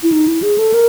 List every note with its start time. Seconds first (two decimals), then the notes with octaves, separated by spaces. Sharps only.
0.03 E4
0.12 D#4
0.28 E4
0.42 G#4
0.58 A4
0.74 A#4